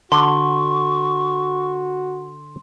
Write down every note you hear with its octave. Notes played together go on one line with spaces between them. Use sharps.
D3 F#4 C6 C#6